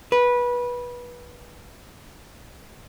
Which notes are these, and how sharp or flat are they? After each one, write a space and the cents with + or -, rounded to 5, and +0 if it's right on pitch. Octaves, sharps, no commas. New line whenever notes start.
B4 -20